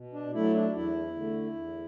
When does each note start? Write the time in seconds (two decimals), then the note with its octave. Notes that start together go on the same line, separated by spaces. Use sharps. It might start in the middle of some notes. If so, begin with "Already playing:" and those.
Already playing: B2
0.13 D4
0.34 F#3 A3 E4
0.54 D4
0.75 E2 E4
1.15 D3 A3
1.55 E2